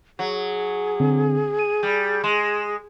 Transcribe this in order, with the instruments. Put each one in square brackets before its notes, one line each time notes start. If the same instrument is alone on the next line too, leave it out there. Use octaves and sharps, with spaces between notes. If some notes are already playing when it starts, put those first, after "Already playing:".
[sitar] F#3 [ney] G#4
[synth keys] D3 C4
D#7
[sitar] G3
[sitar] G#3 [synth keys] C6 E7